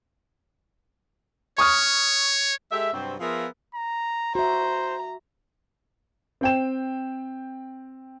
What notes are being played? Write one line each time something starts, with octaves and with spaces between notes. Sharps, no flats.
C#5 C#6 D#6 F6
G#3 G4 A4 E5
G2 C3 F#3 C4
F3 B3 F4 G#4 A#4 E5
A#5
F#4 C5 E5 A#5
C4 G5 E7